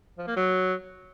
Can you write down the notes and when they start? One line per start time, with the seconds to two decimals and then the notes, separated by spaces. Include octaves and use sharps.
0.18 F3
0.27 A#3
0.37 F#3